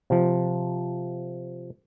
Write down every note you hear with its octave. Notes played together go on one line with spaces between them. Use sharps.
C3 F3